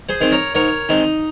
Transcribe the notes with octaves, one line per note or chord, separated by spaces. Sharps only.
G#4 C5
D#3 G#3 C4
A#4 C#5
G#2 A#4 C#5
D#3 G#3 C4 D#4